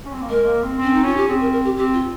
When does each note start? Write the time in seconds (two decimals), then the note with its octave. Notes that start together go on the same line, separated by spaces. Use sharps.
0.06 C#4
0.13 C4
0.22 A#3
0.30 G#3 A#4
0.46 A#3
0.63 C4
0.78 C4 C#4
0.94 D#4
1.04 C#4 F4
1.17 G4
1.28 C4 G#4
1.41 A#4
1.53 A#4
1.64 G4
1.77 C4 G4
1.94 F4